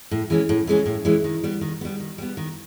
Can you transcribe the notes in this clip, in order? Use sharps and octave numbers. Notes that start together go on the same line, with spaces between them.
A2
E3 G#3 C#4
A2
E3 G#3 C#4
A2
E3 G#3 C#4
D#3
G3 B3
D#3
G3 B3
D#3
G3 B3
D#3